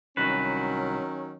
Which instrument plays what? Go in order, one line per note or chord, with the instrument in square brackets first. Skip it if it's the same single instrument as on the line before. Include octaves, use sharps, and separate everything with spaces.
[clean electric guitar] C2 F#4 B4 [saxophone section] D#3 F#3 C#4